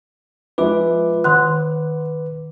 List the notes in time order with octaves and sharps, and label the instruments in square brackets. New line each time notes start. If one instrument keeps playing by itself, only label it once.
[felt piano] F3 G#3 E5 [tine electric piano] B4 D6
[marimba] D#3 C6 F#6 [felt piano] F#5